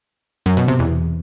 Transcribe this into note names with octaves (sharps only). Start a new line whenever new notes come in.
F#2
B2
C3
E2